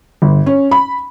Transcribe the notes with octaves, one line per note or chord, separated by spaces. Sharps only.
G1
C#4
B5